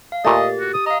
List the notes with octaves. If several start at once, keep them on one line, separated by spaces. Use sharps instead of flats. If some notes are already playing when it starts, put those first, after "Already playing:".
F5
A#2 A3 G4 D#5 A6
F#4
D#6
D#5 F5 A#5